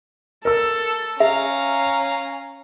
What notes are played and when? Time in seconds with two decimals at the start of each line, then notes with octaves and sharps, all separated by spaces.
0.45 A4 A#4 E6
1.20 C#4 E5 F5 A#5